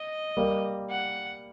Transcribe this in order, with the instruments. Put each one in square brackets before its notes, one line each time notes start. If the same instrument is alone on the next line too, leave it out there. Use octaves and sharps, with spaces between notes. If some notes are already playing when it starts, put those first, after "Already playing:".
Already playing: [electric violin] D#5
[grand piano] G3 A#3
[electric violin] F#5